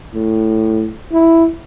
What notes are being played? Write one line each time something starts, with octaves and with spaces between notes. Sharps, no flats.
A2
E4